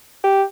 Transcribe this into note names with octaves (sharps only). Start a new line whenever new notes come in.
G4